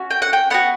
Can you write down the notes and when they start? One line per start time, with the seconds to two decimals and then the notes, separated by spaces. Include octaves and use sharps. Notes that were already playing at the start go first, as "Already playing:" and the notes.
Already playing: C#4 F#4
0.11 G5
0.22 F#5
0.33 G5
0.50 B3 D4 F#4 F#5